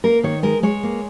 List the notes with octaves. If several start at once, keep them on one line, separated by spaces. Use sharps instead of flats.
A#3 A#4
D#3 C#5
G#3 A#4
G#3 C#5
A#3